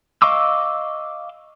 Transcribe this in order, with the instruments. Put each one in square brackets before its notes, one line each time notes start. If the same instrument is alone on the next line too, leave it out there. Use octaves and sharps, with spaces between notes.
[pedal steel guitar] D#5 F5 C#6 D6 E6